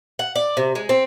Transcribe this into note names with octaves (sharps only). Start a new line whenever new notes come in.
F#5
D5
C3
G#3
C4